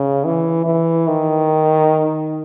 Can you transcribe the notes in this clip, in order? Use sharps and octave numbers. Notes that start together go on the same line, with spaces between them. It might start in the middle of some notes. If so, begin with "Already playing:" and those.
Already playing: C#3
E3
E3
D#3